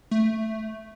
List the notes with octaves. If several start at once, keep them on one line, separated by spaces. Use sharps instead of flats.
A3